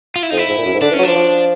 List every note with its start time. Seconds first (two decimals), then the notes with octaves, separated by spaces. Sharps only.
0.16 F4
0.23 E4
0.30 F2 D#4
0.37 E4
0.49 G#2
0.57 A#2
0.65 F#2
0.74 G#2
0.81 D3 D4
0.90 E3
0.93 C#4
0.99 F#3
1.03 F3 D4
1.15 F3